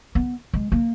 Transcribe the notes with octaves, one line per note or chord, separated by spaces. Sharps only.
B3
G#3
A#3